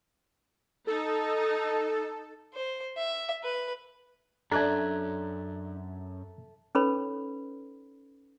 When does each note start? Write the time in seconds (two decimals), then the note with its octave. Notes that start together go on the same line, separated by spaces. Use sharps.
0.87 D#4 A4
2.54 C5
2.97 E5
3.44 B4
4.51 F#2 D4 A4 E5 A#5 F#6 G#6
6.75 C#4 D#4 A4 B4 C#5 B5